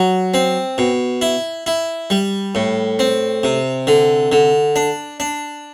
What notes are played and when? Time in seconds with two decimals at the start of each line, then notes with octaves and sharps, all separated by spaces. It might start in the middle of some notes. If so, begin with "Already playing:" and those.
Already playing: F#3
0.34 C4
0.78 B2
1.22 E4
1.66 E4
2.10 G3
2.55 A2
2.99 C4
3.43 C3
3.87 D3
4.32 D3
4.76 D4
5.20 D4